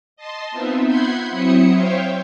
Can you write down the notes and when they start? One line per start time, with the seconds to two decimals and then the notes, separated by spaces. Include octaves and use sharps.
0.17 D#5 A5 C6
0.52 B3 C4 D#4 F4 E5
0.86 F#5 B5 C6 G6 G#6 C7
1.31 F#3 C4 E4 E5 D#6 C#7
1.70 C5 C#5 E5 F5 G5